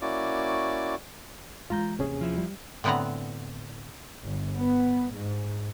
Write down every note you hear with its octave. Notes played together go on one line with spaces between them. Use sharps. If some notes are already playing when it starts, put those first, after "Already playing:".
A#3 C#4 E4 F#4 D5 D6
E3 G#3 F4 A#5 G6
D#2 C3 E3 C#4 G#4
F3 E4
G3
A2 D3 B3 C4 F#5 A#5
G1
B3
G#2